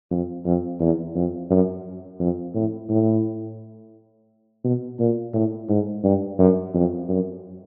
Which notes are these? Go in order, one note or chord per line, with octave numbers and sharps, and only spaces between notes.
F2
F2
E2
F2
F#2
F2
A2
A2
B2
A#2
A2
G#2
G2
F#2
F2
F#2